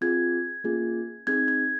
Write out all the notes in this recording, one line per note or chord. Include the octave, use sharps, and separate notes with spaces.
C4 F4 G#4 G#6
A#3 C#4 F4 G#4
C4 D#4 G#4 G#6
G#6